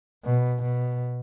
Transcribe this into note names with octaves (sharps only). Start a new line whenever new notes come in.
B2
B2